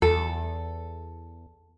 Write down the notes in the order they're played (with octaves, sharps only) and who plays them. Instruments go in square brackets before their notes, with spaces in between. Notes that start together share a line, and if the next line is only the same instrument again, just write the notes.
[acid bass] E2 [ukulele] A4